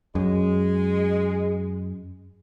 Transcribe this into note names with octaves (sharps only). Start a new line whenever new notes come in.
F#2 G#3